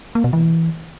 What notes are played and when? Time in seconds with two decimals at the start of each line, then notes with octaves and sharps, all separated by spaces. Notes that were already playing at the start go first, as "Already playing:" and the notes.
0.15 A#3
0.24 B2
0.33 E3